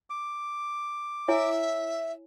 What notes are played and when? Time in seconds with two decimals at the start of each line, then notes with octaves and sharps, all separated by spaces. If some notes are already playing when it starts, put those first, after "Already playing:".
0.10 D6
1.28 E4 C#5 E5 G#5